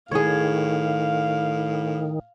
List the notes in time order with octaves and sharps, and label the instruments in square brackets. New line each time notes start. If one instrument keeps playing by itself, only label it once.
[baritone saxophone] A2 [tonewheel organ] D#3 [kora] G#4 C#5 [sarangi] F5